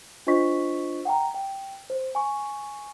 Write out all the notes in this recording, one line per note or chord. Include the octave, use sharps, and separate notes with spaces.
D4 F4 C5 D#5 C#6 B6
F#5 G5 A#5
G5
C5
G#5 C#6